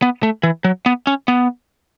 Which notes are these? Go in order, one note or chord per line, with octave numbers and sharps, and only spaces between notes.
B3
A3
E3
F#3
B3
C#4
B3